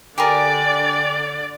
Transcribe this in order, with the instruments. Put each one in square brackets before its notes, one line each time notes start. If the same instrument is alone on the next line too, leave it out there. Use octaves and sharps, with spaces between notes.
[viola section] D3 D5 [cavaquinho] G4 G#4 A#4